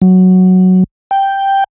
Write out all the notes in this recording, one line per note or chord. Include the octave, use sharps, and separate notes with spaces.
F#3
G5